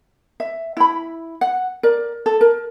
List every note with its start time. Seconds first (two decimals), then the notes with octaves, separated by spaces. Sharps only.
0.40 E5
0.77 E4 B5
1.41 F#5
1.83 A#4 D5
2.26 A4
2.41 A#4